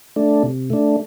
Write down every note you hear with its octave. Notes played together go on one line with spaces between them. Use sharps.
A3 D4
C3
A3 D4